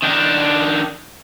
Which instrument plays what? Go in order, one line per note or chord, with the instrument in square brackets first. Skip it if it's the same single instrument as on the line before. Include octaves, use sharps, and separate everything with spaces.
[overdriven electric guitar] D#3 D4